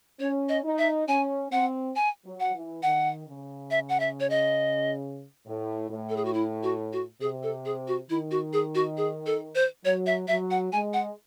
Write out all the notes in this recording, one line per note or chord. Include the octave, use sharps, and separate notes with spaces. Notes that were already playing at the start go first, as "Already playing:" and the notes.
C#4 C#5
D#5
D#4
E5
C#4 G#5
C4 F#5
G#5
F#3
F#5
E3
D#3 F#5
C#3
E5
F#5
E5
C#5
D#5
A2
A2
A4
G#4
F#4
E4
F#4
F#4
C3 G#4
A4
G#4
F#4
D#3 E4
F#4
G#4
F#4
G#4
A4
C5
F#3 C#5
E5
F#3 E5
F#5
G#3 G#5
F#5